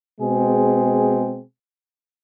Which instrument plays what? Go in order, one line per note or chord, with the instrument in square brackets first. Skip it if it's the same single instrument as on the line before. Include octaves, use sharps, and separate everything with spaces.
[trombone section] B2 G#3 C4 G#4